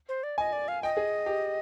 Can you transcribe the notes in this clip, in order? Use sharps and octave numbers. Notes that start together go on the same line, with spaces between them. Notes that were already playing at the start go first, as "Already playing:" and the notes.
C5
D5
D#5 G#5
D5
F5
D#5 G5
G#4
G4